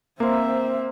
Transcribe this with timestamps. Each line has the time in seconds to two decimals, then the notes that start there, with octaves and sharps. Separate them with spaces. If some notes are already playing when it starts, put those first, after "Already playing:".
0.20 A#3 C4 A#4 C5 E5